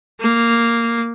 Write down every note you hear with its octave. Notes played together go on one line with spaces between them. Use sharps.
A#3